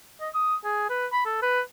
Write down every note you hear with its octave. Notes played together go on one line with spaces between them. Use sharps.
D#5
D#6
G#4
B4
B5
A4
B4